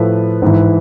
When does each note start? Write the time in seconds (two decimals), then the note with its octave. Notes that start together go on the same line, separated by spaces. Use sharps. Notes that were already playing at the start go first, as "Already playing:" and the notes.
Already playing: A2 F3 A4 B4
0.42 G#2 E3